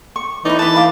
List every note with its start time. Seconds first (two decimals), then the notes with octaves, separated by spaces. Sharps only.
0.16 C#6
0.45 E3 D#4 D5 B5
0.59 B4 A5 B5
0.76 B4 F5 D6